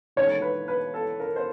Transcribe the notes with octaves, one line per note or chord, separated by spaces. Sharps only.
E1 D#2 D3 C#5
B4
B4
A4
A#4
C5